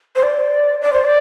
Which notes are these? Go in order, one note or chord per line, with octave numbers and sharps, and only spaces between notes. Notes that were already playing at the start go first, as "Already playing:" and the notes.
C5
D5
D5
C5
D5